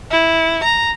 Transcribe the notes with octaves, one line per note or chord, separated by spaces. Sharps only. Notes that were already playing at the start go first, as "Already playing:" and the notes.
E4
A#5